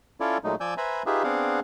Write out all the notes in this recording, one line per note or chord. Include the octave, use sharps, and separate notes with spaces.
C#4 E4 F4 A4 C#5 D5
A#2 F#3 G#3 A3 D#4
F3 D5 G#5 E6 G6
B4 C5 E5 G#5 A#5 B5
D#4 F4 G4 G#4 B4 E5
B3 C4 D4 G#4 F5 F#5